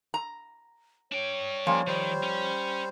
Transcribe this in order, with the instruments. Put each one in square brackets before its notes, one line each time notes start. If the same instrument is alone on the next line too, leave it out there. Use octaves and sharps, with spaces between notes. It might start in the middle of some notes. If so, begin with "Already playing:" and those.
[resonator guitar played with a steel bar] A#5
[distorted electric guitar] D4 G5 [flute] C#5
[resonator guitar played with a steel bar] F3 [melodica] G3 A#3 C#4
[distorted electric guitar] D#3 [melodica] G3 C5
[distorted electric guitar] C#4